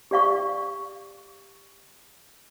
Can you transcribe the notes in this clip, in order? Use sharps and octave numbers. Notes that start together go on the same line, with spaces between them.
G4 D5 F5 C#6